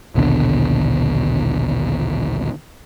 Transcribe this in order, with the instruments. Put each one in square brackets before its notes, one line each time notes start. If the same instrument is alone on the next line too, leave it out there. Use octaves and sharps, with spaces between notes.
[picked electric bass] A#1 D#2 B2 D3